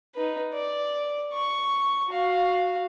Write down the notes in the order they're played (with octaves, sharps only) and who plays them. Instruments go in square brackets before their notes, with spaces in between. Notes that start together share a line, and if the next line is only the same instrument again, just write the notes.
[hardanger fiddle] D#4 B4
D5
C#6
F#4 F5